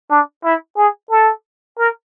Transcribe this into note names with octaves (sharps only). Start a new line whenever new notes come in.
D4
E4
G#4
A4
A#4